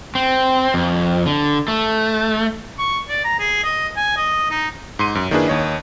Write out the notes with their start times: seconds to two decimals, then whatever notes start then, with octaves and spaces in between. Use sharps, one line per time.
0.15 C4
0.74 F2
1.26 D3
1.68 A3
2.79 C#6
3.09 D5
3.25 A#5
3.39 G#4
3.64 D#5
3.97 G#5
4.17 D#5
4.50 D#4
4.99 G#2 C6 D#7
5.15 F#2
5.31 D#3 A#3 D4 E4 G#4 B4
5.48 D#2 C#5 D#5